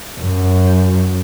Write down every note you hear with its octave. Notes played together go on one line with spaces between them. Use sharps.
F#2